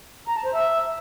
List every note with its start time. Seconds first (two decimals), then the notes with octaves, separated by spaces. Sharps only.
0.27 A#5
0.36 A5
0.45 C5
0.54 E5